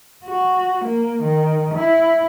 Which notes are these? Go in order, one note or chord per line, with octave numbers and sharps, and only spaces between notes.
F#4
A#3
D#3
E4